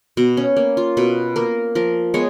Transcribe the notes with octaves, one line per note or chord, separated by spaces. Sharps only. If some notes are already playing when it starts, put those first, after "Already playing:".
B2 B3
C#4
A#3
F4
B2 B4
A#3 A#4
F3 A#4
G#3 B3 C#5